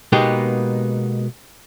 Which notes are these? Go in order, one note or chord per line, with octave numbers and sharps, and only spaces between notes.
B2 G#3 A#3 B3 D#4 G4